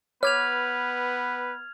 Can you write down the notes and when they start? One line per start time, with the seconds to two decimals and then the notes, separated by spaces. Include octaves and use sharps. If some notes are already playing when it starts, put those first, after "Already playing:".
0.23 B3 B4 C#5 C#6 D6 F6 G#6 F7